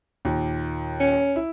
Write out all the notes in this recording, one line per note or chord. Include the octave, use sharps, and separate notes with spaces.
D#2 A#2
C#4
E4